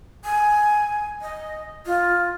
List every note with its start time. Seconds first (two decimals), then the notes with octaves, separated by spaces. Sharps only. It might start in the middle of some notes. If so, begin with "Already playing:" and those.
0.24 G#5
1.21 D#5
1.86 F4